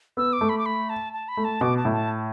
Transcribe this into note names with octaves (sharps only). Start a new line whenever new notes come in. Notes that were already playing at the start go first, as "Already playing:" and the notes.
B3 E6
D6
A3
B5
D6
B5
A5
A5
B5
A3
A5
B2 D6
A5
A2
A5